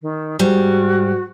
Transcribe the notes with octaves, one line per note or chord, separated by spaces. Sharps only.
D#3
G#2 G3 F#4